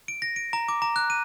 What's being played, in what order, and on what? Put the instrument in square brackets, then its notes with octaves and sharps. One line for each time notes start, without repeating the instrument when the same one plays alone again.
[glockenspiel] D7
A#6
D7
A#5
D6
A#5
F#6
D#7